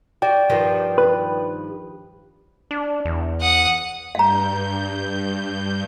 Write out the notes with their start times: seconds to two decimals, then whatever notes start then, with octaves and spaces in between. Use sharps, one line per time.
0.22 F#4 D5 G5
0.50 G2 D#3 F3
0.98 B4
2.71 D4
3.05 E2
3.41 F#5 D#6
4.15 G2 F5 A#5 G6